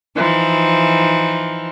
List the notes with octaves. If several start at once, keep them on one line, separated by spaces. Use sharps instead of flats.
E3 F3 D#4